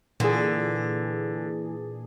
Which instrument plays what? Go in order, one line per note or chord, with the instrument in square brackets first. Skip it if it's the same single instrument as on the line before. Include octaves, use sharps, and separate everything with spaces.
[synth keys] A#2 G#4 [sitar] D3 [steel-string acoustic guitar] E3